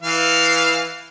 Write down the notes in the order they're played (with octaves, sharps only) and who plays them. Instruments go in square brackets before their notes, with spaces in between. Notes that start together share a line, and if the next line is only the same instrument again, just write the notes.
[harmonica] E3 F5